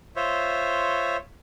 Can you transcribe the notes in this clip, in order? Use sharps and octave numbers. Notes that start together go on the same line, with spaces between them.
F4 C5 C#5 E5